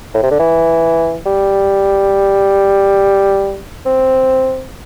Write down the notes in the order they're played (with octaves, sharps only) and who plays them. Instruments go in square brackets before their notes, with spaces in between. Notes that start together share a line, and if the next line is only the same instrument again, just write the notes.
[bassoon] A2
C3
D3
E3
G3
C4